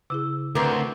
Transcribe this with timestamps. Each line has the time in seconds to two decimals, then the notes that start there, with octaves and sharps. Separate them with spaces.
0.10 C#3 E4 G#4 E6
0.55 D2 D3 C4 A#4 B4 D6